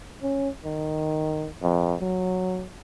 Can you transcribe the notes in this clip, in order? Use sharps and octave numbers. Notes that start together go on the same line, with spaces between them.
C#4
D#3
F2
F#3